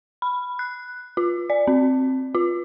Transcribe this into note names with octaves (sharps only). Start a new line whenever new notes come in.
B5
F#6
F4
D5
C4
F4